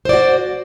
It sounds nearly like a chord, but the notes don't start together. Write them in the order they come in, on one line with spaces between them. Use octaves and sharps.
C5 D5 F#4